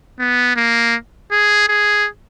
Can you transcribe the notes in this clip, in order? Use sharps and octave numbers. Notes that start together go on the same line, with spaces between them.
B3
A#3
G#4
G#4